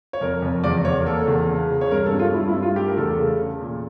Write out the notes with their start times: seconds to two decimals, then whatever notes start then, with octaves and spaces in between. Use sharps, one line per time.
0.13 C#5
0.21 F2 A#4
0.42 F2
0.64 E2 D5
0.85 E2 C#5
1.00 A#4
1.06 A#3 A4
1.28 E2
1.49 C#3
1.70 C#3
1.81 C#5
1.91 G2 A#4
2.06 A4
2.12 G2
2.19 F4
2.34 G2 E4
2.48 E4
2.56 G2
2.62 F4
2.76 A3 G4
2.88 A#4
2.97 E2 A4
3.19 C#3
3.40 C#3
3.61 A#2